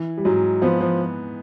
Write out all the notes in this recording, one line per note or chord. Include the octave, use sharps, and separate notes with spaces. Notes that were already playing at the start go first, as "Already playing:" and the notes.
Already playing: E3
G3
G#2 F#3
F3 B3
F3